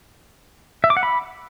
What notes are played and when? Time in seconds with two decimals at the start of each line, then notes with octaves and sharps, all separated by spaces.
0.84 E5
0.90 D6
0.97 F#5
1.03 B5